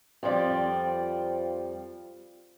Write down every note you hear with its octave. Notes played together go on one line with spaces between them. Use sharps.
F2 F3 G3 D5